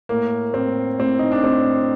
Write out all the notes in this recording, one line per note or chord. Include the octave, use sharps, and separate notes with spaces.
A2 A#3
A2 C4
A2 C4
D#4
D4
A2 C4